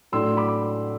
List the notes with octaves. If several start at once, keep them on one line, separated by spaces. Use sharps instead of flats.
A2 F#3 A3 D4 C6 E6
B5 D6